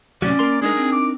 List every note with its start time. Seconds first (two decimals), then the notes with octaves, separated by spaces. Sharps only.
0.22 A2 C3 F#3 C#4 D5
0.39 A#3 A#4 C6
0.62 G#3 D4 D#4 G#4 A#4
0.77 C4
0.92 D6